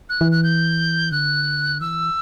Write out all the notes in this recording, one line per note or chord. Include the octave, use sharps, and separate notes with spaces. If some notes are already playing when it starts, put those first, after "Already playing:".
F#6
E3
F#6
G6
D3 F#6
E3 E6